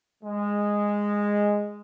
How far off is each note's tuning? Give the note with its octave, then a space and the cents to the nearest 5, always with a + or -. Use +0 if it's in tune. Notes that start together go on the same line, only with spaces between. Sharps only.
G#3 -10